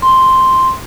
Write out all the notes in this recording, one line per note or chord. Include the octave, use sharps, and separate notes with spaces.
C6